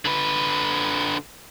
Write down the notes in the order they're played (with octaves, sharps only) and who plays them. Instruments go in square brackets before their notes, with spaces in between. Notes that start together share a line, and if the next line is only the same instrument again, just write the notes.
[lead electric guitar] D3 B4